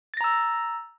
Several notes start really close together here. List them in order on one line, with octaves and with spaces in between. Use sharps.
A6 A#6 A#5 E6